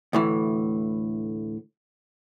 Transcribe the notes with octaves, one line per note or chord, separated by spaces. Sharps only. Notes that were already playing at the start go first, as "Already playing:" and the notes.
D2 A2 E3